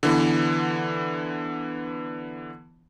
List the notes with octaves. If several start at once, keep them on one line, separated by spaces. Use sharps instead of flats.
D3 E3 B3